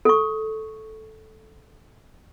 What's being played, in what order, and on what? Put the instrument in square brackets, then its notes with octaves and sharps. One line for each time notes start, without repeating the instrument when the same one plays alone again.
[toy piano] A4 C#6